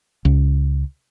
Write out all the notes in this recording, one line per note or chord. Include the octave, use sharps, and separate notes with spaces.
C#2